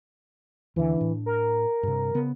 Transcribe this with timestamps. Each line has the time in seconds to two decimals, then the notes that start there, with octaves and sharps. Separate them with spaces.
0.76 D#2 D3 E3
0.97 A2 D4
1.26 A#4
1.83 G2 C3
2.14 C#3 B3